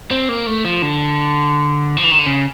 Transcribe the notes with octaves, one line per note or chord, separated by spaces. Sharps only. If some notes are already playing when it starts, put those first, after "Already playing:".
C4
A#3
A3
F3
D3
F3
E3
D#3
D3
C#3